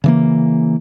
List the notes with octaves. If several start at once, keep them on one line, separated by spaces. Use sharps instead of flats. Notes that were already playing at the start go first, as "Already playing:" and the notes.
C#3 E3 A#3